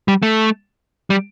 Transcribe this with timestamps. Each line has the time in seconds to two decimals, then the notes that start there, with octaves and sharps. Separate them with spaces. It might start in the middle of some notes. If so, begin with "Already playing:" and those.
0.08 G3
0.23 A3
1.10 G3